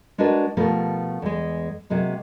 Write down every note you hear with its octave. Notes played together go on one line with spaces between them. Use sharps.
G#3 D4 F#4 A#4 B4 D5
B2 F3 A3 B3 G4 A#4
E2 G#3
C3 F#3 G#3 A#3